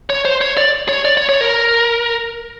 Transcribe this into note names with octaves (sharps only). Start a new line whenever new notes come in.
C#5
C5
C#5
D5
C#5
D5
C#5
C#5
A#4